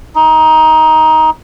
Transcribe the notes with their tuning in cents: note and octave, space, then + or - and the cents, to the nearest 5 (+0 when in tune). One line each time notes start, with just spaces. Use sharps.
D#4 +15